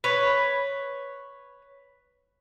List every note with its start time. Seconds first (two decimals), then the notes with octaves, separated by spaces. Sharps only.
0.04 B4 C#5